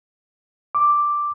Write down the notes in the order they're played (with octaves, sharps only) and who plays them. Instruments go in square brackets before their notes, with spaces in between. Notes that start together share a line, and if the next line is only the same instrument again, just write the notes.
[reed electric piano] D6